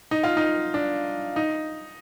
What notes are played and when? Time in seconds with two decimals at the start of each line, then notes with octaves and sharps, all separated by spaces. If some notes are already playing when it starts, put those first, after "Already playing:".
0.11 D#4
0.23 F4
0.37 D#4
0.74 D4
1.36 D#4